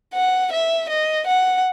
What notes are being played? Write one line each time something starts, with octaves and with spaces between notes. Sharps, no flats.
F#5
E5
D#5
F#5